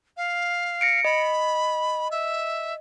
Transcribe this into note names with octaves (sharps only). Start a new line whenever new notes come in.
F5
A#6 C#7 D7
D#5 B5
E5